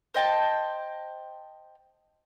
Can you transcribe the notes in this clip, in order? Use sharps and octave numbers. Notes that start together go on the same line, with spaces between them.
C5 D#5 G5 A5